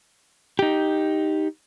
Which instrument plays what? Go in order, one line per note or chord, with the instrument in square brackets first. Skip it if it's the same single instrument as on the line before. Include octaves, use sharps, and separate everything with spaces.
[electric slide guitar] D#4 G4